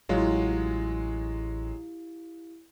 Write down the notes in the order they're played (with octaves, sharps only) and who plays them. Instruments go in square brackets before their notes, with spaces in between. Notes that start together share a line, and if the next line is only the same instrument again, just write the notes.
[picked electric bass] A1 [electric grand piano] F#3 G#3 F4 [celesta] E4 G4 F5